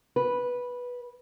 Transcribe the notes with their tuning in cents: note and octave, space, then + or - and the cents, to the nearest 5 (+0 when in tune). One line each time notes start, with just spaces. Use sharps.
B4 -10